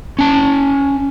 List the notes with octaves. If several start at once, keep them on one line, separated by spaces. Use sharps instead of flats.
C#4 A5